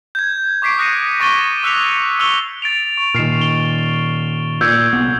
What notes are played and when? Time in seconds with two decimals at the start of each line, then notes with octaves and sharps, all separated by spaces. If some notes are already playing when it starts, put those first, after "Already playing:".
0.15 G6 G#6
0.62 C#6 D6 B6 C7 D7
0.78 D#6 F#6 A#6 C7 C#7 D#7
1.20 C#6 D6 A6 B6 D#7 G7
1.63 D6 E6 F#6 B6 C#7 F7
2.19 C#6 E6 F#6 F7 G7
2.62 A6 D7 F7
2.97 C#6
3.14 A#2 D#3 F6 C7 E7
3.41 G7
4.61 A#2 E6 G6 G#6
4.93 C2 B3